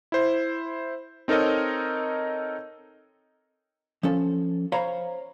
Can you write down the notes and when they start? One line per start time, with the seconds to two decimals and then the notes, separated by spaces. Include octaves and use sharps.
0.12 E4 C5
1.28 C4 D#4 A4 A#4 C#5 D#5
4.03 F3 C#4 A4
4.72 C5 C#5 F5 A#5 B5